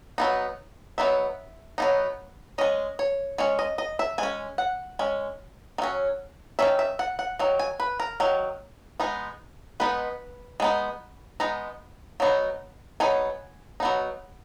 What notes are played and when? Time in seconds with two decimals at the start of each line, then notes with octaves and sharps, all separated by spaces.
0.18 F#3 B3 D#4
0.98 F#3 B3 D#4 E5
1.78 F#3 B3 D#4
2.58 G#3 C#4 D#5
2.99 C#5
3.38 G#3 C#4 C#5
3.59 D#5
3.78 D#5
3.99 E5
4.18 G#3 C#4 G#5
4.58 F#5
4.99 G#3 C#4
5.78 D#3
5.82 F#3 C#4
6.59 D#3 F#3 C#4 E5
6.79 E5
6.99 F#5
7.19 F#5
7.39 D#3 F#3
7.59 G#5
7.80 B4
8.00 A#4
8.20 D#3 F#3
9.00 G#3 B3 D#4
9.80 G#3 B3 D#4 B4
10.60 G#3 B3 D#4
11.40 G#3 B3 D#4 A#5
12.20 F#3 B3 D#4
13.00 F#3 B3 D#4 G#5
13.80 F#3 B3 D#4